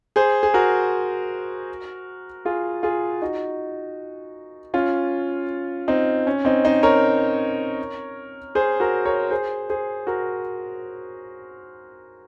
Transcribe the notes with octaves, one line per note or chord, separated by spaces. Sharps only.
G#4 C5
G#4
F#4 A#4
F4 G#4
F4 G#4
D#4 F#4
C#4 F4
C4 D#4
C#4
C4 D#4
C4 D#4
A#4 C#5
G#4 C5
F#4 A#4
A#4 C#5
G#4 C5
G#4 C5
F#4 A#4